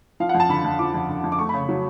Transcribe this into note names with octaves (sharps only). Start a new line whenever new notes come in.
F3 F5
F#5
F2
A5
D3 B5
F2
F3 D6
F2
D3
F2
D6
A3 C#6
C#3 B5
F#3